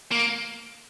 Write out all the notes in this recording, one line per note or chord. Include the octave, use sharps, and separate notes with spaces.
A#3